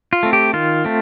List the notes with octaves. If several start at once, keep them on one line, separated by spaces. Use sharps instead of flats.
F4
A3 C4
G4
D#3 F4
A3 C4